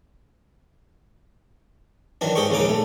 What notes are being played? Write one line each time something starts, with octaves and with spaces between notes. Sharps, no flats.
F#2 D#3 E3 D4
G#2 G4 G#4 G5 C#6
A#1 D#2 C#3 D#4 D6
A3